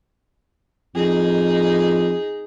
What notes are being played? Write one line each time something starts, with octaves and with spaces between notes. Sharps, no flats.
F2 D#4 G#4